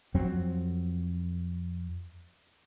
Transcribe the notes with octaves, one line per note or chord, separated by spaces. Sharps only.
F2 F#3 C4